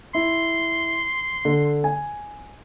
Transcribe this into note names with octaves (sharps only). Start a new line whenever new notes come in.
E4 C6
D3
G#5